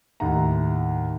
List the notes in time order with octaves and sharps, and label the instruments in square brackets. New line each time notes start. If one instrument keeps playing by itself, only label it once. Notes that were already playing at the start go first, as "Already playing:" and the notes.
[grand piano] D#2 A2 D#4 F#5 A#5